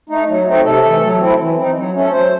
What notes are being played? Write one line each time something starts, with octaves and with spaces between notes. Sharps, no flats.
A3 D#4
F#3
A3 C4 D#4
C3 A4
E3 A3
F#3
C4 E4
E3
C4 D#4
F#3
A3 C#4
A4
F#3 C5